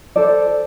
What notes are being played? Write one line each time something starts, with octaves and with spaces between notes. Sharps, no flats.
A4 C5 D5